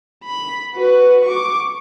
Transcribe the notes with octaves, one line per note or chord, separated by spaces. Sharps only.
B5
F#4 B4
C#6 D6